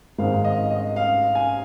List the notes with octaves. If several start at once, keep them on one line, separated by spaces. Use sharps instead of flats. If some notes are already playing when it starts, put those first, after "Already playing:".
G#1 G#2 D#3 G#3 C4 F5
D#5
D#5
F5
G#5